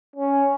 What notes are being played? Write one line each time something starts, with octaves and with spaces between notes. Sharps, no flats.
C#4